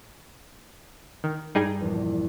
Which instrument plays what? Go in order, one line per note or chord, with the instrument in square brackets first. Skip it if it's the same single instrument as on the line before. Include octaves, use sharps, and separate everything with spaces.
[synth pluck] D#3
[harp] G2 [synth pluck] G3 D#4 G#4
[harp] A#1 E2